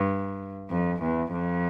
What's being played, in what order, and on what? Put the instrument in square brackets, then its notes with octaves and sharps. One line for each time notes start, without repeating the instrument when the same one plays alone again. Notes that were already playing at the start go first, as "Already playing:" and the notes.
Already playing: [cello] G2
F2
E2
F2